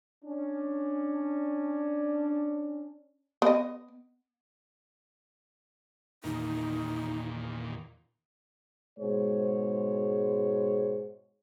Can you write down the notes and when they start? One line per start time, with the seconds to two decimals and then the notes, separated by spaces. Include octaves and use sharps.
0.25 C#4 D4
3.42 B3 D#5
6.24 E2 A#2 D#3 D#4
8.99 G#2 B2 G#3 C5 C#5